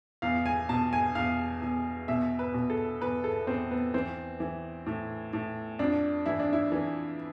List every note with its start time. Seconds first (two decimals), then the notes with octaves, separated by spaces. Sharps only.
0.22 E2 F5
0.46 G#5
0.69 B2 A5
0.93 G#5
1.15 E2 F5
1.62 E2
2.08 B2 E5
2.39 B4
2.54 B2
2.70 A4
3.01 E2 B4
3.24 A4
3.47 E2 C4
3.71 B3
3.94 E3 C4
4.40 E3
4.86 A2
5.33 A2
5.79 F2 D4
6.26 E3 E4
6.40 D4
6.53 E4
6.72 E3